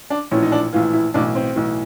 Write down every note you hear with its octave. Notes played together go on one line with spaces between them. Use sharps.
D4
A#1 A2 E3 C#4
D#4
D4
A#1 A2 E3 F4
E4
B1 A2 E3 D4
C4
B1 A2 E3